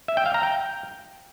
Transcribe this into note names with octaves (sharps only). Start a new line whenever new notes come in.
E5
G5
F5
A#5
G5